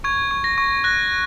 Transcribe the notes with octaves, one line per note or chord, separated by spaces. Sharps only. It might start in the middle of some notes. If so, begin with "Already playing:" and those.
C#6 G#6
C#6
A#6
C#6
F#6 A#6